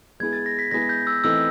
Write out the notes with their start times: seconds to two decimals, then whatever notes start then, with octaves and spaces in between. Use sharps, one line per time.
0.20 G#3 B3 E4 G#4 G#6
0.33 A6
0.46 A#6
0.59 B6
0.71 G#3 B3 E4 G#4 A#6
0.89 G6
1.07 E6
1.24 E3 A3 C4 D#4 E6